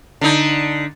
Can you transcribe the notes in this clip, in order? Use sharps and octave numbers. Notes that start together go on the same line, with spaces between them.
D3 D#4